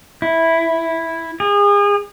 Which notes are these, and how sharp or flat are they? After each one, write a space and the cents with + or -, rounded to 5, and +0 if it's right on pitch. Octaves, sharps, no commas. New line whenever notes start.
E4 -5
G#4 -35